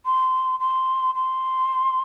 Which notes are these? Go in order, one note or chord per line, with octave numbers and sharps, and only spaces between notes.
C6
C6
C6